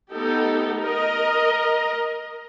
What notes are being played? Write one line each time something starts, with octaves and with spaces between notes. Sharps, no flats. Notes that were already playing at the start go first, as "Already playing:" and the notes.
A3 B3 D#4 G4 A4
A#4 D#5